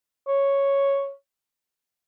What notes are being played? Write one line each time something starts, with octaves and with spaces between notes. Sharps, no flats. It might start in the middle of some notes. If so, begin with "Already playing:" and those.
C#5